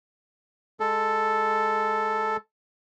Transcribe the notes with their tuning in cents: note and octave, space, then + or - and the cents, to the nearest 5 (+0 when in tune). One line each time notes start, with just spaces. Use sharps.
G#3 +0 A4 +0